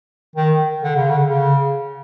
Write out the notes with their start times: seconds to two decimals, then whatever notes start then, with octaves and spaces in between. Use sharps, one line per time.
0.36 D#3
0.83 D3
0.96 C#3
1.10 D3
1.29 C#3